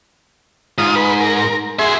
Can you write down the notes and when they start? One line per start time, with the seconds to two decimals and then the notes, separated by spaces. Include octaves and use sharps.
0.78 G#2 F4 D#6
0.95 B4
1.20 A#4
1.79 F#4 G#4 E5 C6